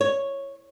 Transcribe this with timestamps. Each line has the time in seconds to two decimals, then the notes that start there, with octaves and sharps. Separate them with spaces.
0.01 C#5